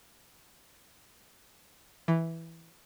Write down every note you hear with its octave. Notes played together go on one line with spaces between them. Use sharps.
E3